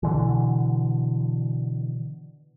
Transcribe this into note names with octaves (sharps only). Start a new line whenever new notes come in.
B2 D3 E3